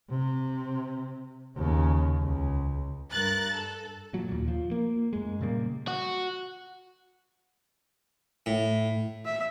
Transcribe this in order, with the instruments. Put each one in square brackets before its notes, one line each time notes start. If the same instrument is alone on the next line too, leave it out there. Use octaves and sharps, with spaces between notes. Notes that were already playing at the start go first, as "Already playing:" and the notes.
[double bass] C3
D#2 C#3
C#2
[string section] G2 A#4 F#6 A6
A4
[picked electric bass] A#2 F#3
D#2 A#2
F3
A#3
F#2 G#3
A#2 C#3 G3 A#3
[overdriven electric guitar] F#4
[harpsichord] A2
[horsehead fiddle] E5